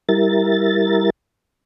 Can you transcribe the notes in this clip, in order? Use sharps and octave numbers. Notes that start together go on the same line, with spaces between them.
G3 E4 A#4 A6